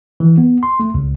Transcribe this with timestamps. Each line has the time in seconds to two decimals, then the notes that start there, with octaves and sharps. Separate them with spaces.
0.20 E3
0.38 B3
0.63 C6
0.80 A3
0.94 C#2